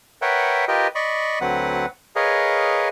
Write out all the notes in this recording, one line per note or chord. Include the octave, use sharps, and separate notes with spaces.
A#4 B4 C#5 E5 F#5 G5
F4 G4 A#4 B4 D#5 G5
D5 D#5 B5 C#6
D2 F#3 C4 B4 F#5
G#4 A#4 B4 C#5 D#5 F5